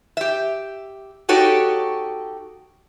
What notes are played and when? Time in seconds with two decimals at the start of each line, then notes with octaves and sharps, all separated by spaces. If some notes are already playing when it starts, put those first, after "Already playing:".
0.17 G4 E5
1.29 D#4 F#4 G4 A4 C#5